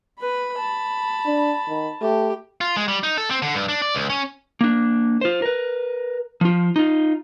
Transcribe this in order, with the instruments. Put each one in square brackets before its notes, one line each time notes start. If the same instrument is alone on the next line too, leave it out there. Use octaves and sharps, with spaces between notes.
[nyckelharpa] B4 [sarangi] B5
[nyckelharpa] A5
[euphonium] D4
D#3
[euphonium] A3 [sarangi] G4
[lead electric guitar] F4
G#3
G3
D#4
A4
C4
D3
G2
D4
D5
C#2
C#4
A#3 D4
F4 C5
A#4 B4
F3 F4
D#4 F4